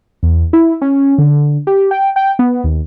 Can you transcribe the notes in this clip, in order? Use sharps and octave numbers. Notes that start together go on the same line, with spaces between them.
E2
E4
C#4
D3
G4
G5
G5
B3
D#2